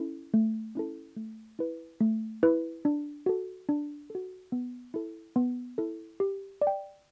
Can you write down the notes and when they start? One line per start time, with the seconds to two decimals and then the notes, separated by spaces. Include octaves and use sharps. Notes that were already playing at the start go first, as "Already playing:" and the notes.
Already playing: C#4 E4 A4
0.34 A3
0.75 C#4 E4 A4
1.16 A3
1.59 E4 B4
2.01 A3
2.43 E4 B4
2.85 D4
3.26 F#4 A4
3.69 D4
4.10 F#4 A4
4.52 B3
4.94 E4 A4
5.36 B3
5.78 E4 A4
6.20 G4
6.62 D5
6.67 G5